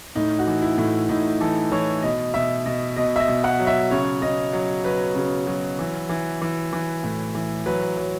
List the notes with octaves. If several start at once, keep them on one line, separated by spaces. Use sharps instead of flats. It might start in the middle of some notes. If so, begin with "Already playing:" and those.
A2 D#4
F#4
E3
E4
A2
A2 D#4
E3 A4
E3 C#5
B2 D#5
B2 E5
B2 D#5
B2 D#5
E5
D#5
B2
F#5
F#3
E5
C#3 C#5
C#3 D#5
F#3
F#3 B4
C#3
F#3
E3
E3
E3
E3
A2
E3
F#3 B4
F#3